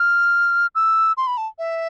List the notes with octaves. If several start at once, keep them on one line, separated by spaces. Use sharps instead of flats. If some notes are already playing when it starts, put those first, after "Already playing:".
Already playing: F6
E6
C6
B5
A5
E5